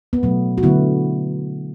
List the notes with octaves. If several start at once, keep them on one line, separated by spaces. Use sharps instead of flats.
B3
B2 F#3 A3
F#4
D3 F#3 A3 B3 E4